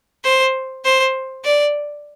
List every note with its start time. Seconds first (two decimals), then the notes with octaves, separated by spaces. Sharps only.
0.24 C5
0.84 C5
1.45 D5